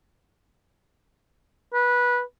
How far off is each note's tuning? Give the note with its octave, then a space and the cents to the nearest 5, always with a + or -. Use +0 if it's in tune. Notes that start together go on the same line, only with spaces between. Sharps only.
B4 -15